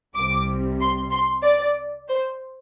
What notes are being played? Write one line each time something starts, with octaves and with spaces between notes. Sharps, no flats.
C2 C3 G3 D6
C6
C6
D5
C5